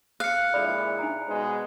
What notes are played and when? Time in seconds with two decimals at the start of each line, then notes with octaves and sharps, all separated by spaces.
0.20 F5 F#6 C#7
0.53 A#1 G#3 E4 A4 D5 B5
0.98 D#4 G#5 A#5
1.28 B2 G#3 C5